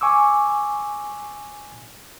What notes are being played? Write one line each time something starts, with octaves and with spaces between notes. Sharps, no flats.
G#5 C#6 D6 E6